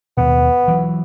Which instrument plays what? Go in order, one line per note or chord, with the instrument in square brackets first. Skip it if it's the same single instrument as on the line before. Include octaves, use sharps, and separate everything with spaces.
[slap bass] D#2 B2 [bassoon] B3
[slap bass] E3 F#3